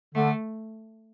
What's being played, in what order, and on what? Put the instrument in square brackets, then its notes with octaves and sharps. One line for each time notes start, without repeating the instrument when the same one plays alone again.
[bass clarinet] D3 [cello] A3